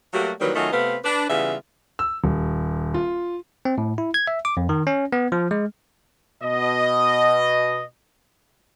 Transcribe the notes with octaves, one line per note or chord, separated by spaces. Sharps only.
F#3 G3 A3 A#3 F#4 G4
D#3 E3 F#3 G3 A#3 B4
D#3 F#3 A3 C#4 F4 D#5
C3 A3 B3 C4 B4 F5
D4 B4
C#3 E3 G3 B3 F4 E5
E6
D#1
F4
C4
A2
E4
G#6
E5
D6
F2
D#3
C#4
B3
F3
G#3
B2 D#5